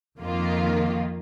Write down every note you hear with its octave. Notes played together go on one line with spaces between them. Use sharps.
F2 D#3 A#3 F4